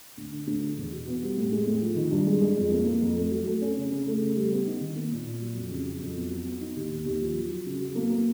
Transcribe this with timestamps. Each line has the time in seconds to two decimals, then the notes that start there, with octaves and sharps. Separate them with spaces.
0.17 D2
0.32 D3
0.47 D2
0.62 D3
0.77 E2
0.92 B2
1.07 B3
1.22 G3
1.37 A2
1.52 G#3
1.67 A2
1.82 F3
1.96 D#3
2.11 G2
2.27 G#3
2.41 G#3
2.57 F2
2.72 A#3
2.86 A#3
3.02 F2
3.16 A3
3.31 F#3
3.46 A3
3.61 C#4
3.77 C#3
3.91 C#3
4.07 A3
4.21 C#3
4.36 G3
4.52 B3
4.66 D#4
4.81 D#3
4.96 A#3
5.12 A#2
5.26 A#2
5.41 F#3
5.56 F2
5.71 C#3
5.86 F#3
6.01 F2
6.16 B3
6.31 F#3
6.46 B3
6.61 D#4
6.76 D#2
6.92 D#2
7.06 D#2
7.21 F3
7.36 F#3
7.51 F#3
7.66 C#3
7.80 F#3
7.95 A#3
8.10 A#3